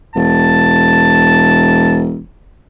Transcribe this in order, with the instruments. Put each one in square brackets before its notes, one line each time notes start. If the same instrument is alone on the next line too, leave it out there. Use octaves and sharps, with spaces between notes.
[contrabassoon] E1 [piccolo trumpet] A5